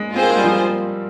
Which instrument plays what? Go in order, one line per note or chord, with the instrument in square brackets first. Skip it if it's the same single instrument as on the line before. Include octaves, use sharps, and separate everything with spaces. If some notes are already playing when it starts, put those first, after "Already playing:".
Already playing: [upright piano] G#3
[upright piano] C4 [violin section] F4 G#4 C5
[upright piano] A#3
G#3
G3
F3